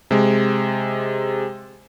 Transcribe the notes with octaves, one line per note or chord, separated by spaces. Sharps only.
C3 G#3